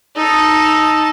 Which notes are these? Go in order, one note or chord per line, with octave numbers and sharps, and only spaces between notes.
D#4 A4